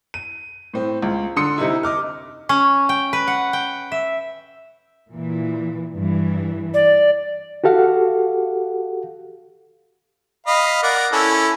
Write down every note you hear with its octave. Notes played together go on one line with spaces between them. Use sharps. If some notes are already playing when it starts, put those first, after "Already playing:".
D#7
A2 C4
C#2
D3 C6 D#6 C#7
C3 D#4 E4
D#5 D6 F6
C#4
G5
B4
F#5
G5
E5
A#2 E3
G2 E3
D5
F#4 G4 A4 F5 F#5
D#5 F5 B5
A#4 D5 F#5
C#4 E4 A4